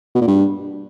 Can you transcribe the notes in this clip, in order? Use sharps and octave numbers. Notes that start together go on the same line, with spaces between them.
B2
A#2
G2